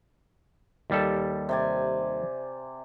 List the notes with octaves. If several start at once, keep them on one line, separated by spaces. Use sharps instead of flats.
D#2 G3 A4
C3 D5 G#5